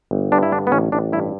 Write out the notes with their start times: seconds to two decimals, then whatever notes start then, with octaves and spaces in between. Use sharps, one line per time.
0.11 G1
0.32 G2 D4
0.43 E4
0.51 D3 D4
0.67 B3
0.72 A1 C#4
0.92 A1 D4
1.12 G2 E4